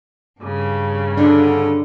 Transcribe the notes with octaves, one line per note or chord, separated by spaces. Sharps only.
G2 C#3
D3 D4